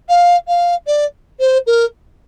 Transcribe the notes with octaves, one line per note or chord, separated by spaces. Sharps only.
F5
F5
D5
C5
A#4